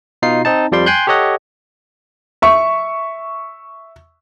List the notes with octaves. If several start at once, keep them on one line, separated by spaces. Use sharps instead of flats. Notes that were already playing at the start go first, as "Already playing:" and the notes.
B2 D#4 F4 C7
C4 D#4 A5
F2 F3 G3 D5 G5 C6
G5 G#5 C6 F#6 G6
G4 A4 C#5 D#5 F#5
E5 C#6